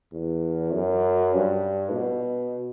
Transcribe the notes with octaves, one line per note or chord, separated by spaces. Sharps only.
E2
F#2
G2
B2